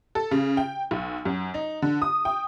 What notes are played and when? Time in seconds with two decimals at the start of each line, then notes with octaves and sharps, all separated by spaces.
0.15 A4
0.31 C#3
0.57 G5
0.91 B1
1.25 F#2
1.54 D#4
1.82 D3
2.02 D#6
2.25 G5